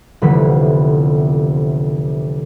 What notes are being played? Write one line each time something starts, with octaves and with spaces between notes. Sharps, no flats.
F1 C2 D3 E3 B3 B6